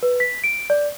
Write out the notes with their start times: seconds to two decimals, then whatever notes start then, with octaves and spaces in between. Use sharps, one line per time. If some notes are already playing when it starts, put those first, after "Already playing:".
0.03 B4
0.20 B6
0.44 D7
0.70 D5